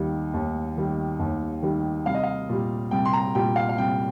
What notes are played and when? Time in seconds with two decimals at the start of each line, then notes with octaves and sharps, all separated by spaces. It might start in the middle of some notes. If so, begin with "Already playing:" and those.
Already playing: D#2 D#3 G3
0.34 D#2
0.77 D#3 G3
1.20 D#2
1.62 D#3 G3
2.06 C2 F5
2.14 D#5
2.23 F5
2.49 A#2 G3
2.91 C2 G5
3.05 C6
3.13 A#5
3.35 A#2 G3 G5
3.56 F5
3.69 F5
3.78 C2 G5